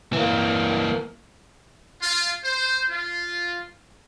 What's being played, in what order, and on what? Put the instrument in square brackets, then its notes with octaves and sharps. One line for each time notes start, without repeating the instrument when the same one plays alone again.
[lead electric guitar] E3 A#3
[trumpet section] F4
C5
F4